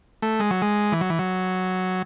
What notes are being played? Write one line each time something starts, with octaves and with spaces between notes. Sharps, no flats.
A3
G#3
F#3
G#3
E3
F#3
E3
F#3